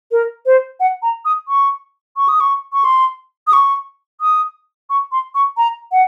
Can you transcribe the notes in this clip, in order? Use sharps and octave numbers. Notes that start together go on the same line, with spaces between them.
A#4
C5
F#5
A#5
D#6
C#6
C#6
D#6
C#6
C#6
C6
D#6
C#6
D#6
C#6
C6
C#6
A#5
F#5